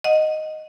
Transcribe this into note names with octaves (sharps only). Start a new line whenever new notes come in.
D#5 F#5